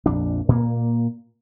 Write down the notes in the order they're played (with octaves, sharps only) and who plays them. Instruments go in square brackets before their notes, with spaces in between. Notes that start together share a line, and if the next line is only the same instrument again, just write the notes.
[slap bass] A#1 F2 D4
A#2 A#3